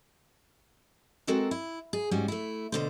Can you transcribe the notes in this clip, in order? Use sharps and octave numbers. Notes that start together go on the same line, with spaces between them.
G#3 C4 F#4 A4 A#4
E4
G#4
G#2 G3 C#4 F#4
A3 E4
B2 D3 C5